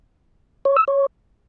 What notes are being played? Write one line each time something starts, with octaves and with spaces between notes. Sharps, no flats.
C#5
E6
C#5